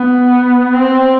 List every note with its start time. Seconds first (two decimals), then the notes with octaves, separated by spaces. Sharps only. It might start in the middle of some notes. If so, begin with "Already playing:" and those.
Already playing: B3
0.73 C4